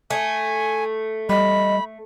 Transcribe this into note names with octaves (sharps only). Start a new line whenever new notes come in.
A3 G#5
G3 D#5 B5